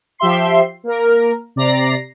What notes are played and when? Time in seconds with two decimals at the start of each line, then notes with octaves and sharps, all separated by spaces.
0.18 F3 G4 E5 C6 C7
0.84 A#3 A#4
1.56 C3 D5 A#5 A#6 C7